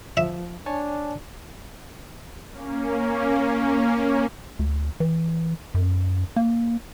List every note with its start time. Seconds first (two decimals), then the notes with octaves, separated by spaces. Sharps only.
0.17 F3 E5
0.66 D4 C#5 G#5 A5
2.51 A#3 C#4
4.59 D2
5.00 E3
5.75 F#2
6.36 A#3